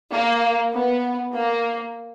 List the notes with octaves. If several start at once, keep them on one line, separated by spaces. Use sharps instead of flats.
A#3
B3
A#3